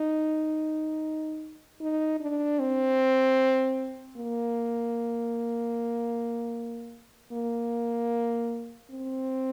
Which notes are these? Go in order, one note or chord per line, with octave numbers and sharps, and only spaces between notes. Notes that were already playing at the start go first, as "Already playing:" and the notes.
Already playing: D#4
D#4
D4
C4
A#3
A#3
C4